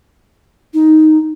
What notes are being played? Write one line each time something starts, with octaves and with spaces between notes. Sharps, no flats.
D#4